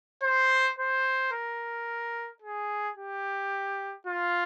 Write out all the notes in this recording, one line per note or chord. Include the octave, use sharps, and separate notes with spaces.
C5
C5
A#4
G#4
G4
F4